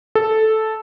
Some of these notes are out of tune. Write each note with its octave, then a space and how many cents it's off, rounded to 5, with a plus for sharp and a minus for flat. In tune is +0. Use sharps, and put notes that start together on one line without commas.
A4 -5